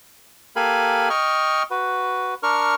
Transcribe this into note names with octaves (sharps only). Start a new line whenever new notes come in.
A#3 G4 A4 F5 G#5 B5
D#5 G5 C#6 F6
F#4 B4
D4 A#4 C#6 F6